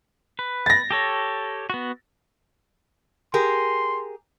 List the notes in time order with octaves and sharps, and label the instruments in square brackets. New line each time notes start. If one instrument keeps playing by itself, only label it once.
[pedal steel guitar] B4
[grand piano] A6 A#6
[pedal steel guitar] G4 A4 C#5
B3 F#4
[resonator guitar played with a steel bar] G4 G#4 A#4 [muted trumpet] C6